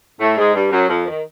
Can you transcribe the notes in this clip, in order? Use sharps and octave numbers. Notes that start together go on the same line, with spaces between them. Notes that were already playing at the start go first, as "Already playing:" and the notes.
A2 A3
G#2 G#3
G2 G3
F#2 F#3
F2 F3
D#3